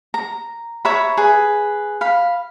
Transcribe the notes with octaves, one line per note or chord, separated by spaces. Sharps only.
A#5
C#5 E5 A#5 B5
G#4 B4
F5 B5